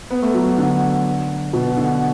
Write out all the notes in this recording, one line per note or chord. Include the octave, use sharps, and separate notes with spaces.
B3
A3
F#3
D3
B2
D3